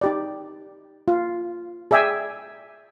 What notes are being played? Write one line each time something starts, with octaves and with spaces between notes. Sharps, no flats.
D#4 G4 D5
F4
G#4 D5 E5 G5 G#5